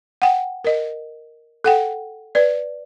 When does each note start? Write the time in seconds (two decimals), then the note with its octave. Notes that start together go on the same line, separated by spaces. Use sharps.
0.22 F#5 G5
0.64 A#4 D#5
1.64 A4 F#5 G5
2.35 B4 D5